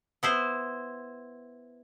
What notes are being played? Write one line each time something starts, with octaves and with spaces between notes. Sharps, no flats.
B3 E4 C5